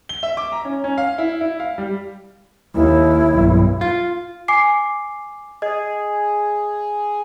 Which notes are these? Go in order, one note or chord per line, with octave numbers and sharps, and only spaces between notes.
G7
E5
D6
A#5
C#4
C#4
F5
E4
E4
F5
G3
D#2 E4
B1 G2
F4
G#5 D6 C7
G#4 D#5